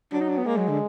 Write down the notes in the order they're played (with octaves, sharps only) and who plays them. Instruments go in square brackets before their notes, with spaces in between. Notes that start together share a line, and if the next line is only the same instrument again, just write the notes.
[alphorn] F#3 [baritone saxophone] D4
[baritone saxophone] D#4
D4
B3
[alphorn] G#3 [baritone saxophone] A#3
[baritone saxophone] F#3
D3